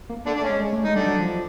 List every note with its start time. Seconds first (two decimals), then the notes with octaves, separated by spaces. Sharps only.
0.09 A#3
0.26 D3 A3 D4
0.37 A3 D4
0.44 C#4
0.50 G#3
0.60 G#3
0.73 A3
0.84 G#3 D#4
0.96 D3 G3 D4
1.07 F#3
1.19 F3